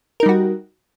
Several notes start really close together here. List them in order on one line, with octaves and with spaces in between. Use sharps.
A#4 D#4 G3 F#4